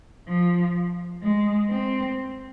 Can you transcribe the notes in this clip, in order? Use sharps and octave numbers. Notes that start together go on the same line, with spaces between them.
F3
G#3
C4